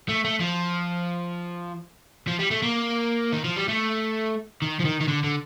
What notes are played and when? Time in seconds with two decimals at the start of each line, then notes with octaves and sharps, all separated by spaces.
0.09 A3
0.25 A3
0.40 F3
2.28 F3
2.39 G3
2.51 A3
2.63 A#3
3.32 D#3
3.44 F3
3.56 G3
3.68 A3
4.62 D#3
4.80 F3
4.85 D#3
5.01 D#3
5.08 D3
5.24 D3